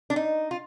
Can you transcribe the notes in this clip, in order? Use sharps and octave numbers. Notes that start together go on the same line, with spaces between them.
D4
D#4
F4